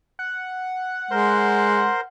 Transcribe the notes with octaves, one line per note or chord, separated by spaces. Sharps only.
F#5
G#3 A#4 C5 C6